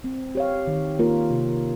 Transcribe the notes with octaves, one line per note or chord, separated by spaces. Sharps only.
C4
G4 C#5 F5
D#3
A#3 F4 A#4
C3